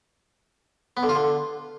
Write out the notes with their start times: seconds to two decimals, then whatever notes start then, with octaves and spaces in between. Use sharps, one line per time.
0.97 B3
1.03 D3
1.09 F4
1.15 D3